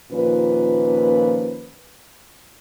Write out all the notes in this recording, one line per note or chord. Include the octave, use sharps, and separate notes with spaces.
D#2 A#2 F3 C#4 B4